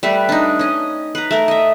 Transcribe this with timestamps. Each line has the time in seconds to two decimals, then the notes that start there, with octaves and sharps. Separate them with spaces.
0.03 G3 A3 B4
0.29 D4 D#4
0.59 C#4 D#5
1.15 B4 A#5
1.31 A3 A#4
1.48 D#5 E5